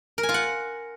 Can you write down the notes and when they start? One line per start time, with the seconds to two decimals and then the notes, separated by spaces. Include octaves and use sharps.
0.18 A#4
0.23 G#5
0.29 F4
0.34 F#5